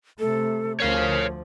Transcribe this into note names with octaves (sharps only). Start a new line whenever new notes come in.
C3 A3 A4
D2 F3 A#4 C#5 F5